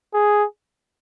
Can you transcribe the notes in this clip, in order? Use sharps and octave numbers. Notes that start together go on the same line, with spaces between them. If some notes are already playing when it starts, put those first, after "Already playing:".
G#4